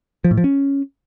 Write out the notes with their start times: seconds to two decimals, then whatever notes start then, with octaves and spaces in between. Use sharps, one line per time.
0.24 F3
0.31 A2
0.38 F3
0.44 C#4